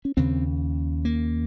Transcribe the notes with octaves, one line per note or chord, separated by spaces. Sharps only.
C#4
D#2 C#3 C4
A#3